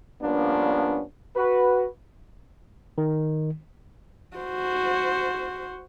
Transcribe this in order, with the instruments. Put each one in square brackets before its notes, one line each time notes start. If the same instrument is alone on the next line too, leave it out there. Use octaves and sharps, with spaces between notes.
[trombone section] G2 F3 A#3 B3 C#4 D4
F#4 B4
[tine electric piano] D#3
[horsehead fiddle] F#4 C5